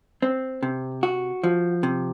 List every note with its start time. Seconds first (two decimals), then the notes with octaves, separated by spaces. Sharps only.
0.22 C4
0.63 C3
1.03 F#4
1.44 F3
1.83 C3